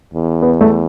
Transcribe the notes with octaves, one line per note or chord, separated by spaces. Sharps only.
E2
B3
A3